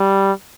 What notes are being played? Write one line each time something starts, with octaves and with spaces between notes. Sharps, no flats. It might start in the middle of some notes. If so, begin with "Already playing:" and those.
Already playing: G3